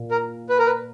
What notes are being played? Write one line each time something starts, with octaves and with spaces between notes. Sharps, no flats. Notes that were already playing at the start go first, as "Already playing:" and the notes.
Already playing: A#2
A#4
B4
A#4
B4